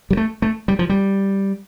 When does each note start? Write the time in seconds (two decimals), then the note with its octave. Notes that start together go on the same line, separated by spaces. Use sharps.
0.11 G3
0.17 A3
0.42 A3
0.68 G3
0.79 F3
0.89 G3